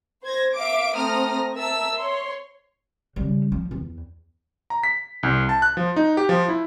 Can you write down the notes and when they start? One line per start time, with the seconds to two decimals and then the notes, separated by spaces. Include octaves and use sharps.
0.23 C5 G#6 A#6
0.54 E5 F5 D6 D7
0.93 A3 C4 A#5 D#6 F6 A#6
1.53 A#4 E5 A5 E6
1.96 C#5 C6
3.16 C#3 G3
3.52 F3
3.71 E2
4.70 A#5
4.84 B6
5.23 C2
5.49 A5
5.62 F#6
5.77 F3
5.96 D#4
6.17 G4
6.29 F3
6.48 E4